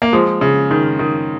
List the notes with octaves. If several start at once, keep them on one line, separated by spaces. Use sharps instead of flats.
A#3
F3 G#3
C#3
D#3
D#3